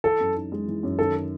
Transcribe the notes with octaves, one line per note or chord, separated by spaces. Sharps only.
E3 A4
F#2
D#4
G#3
E3
F#2
D#3 A4